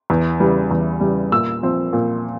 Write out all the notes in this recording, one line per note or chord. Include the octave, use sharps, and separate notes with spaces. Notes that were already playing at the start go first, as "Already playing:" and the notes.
E2
C#3 E3 G3
E2
C#3 E3 G3
A#2 E6
F3 C4
A#2